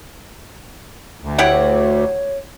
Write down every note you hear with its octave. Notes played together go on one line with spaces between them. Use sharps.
D2
E4 G4 C#5 F#5